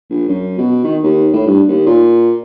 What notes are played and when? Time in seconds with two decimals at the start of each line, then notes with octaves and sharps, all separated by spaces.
0.10 A#1
0.28 F#2
0.58 B2
0.84 D#3
1.04 D#2
1.33 A2
1.47 G2
1.69 D#2
1.87 A#2